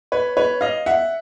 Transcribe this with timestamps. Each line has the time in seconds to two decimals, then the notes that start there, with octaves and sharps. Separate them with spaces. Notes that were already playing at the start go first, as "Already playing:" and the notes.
0.12 B4 C#5
0.37 B4 C#5
0.61 D#5 F5
0.86 E5 F#5